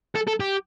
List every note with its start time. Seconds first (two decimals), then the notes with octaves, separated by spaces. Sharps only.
0.15 A4
0.27 A4
0.40 G4